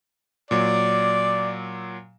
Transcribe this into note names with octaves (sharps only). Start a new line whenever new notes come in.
A#2 F#3 D5